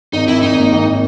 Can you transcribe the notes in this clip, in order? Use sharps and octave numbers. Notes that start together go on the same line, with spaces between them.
G#1 D#4
G#1 E4
G#1 D#4
A#3
G#1